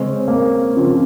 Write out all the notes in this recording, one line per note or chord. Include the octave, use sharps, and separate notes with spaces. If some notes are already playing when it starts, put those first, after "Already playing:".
Already playing: C#3 G#3 C4 C#4
A#3
C#3 F3 C4